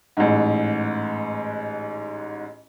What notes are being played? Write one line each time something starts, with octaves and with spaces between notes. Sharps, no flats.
A1 G#2